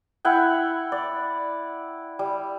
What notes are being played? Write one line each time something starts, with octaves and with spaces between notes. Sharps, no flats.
E4 F#5 G5
D5
G3